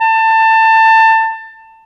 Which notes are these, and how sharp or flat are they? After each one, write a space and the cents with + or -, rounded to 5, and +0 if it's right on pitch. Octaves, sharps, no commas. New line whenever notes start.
A5 +25